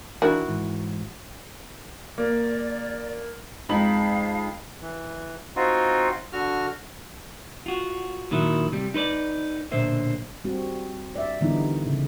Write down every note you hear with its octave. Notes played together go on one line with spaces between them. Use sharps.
D#3 E3 D4 E4 F#4 D5
G#2 E3
A#3 D5
F2 G#3 D#4 F5 B5 F#7
E3
C4 D#4 F4 F#4
D3 F#4 F6
F4 F#4
A#2 D#3 F#3 E4
C3 G3
D#4 B4 C5 D5
B1 A#2 D3 C5 E5
G3 C4 F#4
D5 E5
D3 E3 G3 B3 D#4 E4
C#3